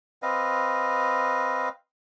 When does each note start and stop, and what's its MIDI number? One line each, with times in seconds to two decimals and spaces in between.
0.22 1.69 60
0.22 1.69 71
0.22 1.69 75
0.22 1.69 77